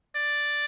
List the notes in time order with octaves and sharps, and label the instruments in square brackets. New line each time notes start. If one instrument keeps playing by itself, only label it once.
[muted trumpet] D5